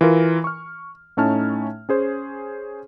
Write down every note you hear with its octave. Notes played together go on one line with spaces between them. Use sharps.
E3 F4 A#4
C#6 F6
A2 A3 C#4 D#4 A5 F6
C#4 G#4 C5